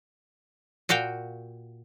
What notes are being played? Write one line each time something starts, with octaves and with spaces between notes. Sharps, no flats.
A#2 F#4 F5 G5